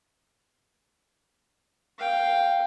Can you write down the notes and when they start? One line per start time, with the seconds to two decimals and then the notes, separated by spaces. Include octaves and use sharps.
1.98 F5 G5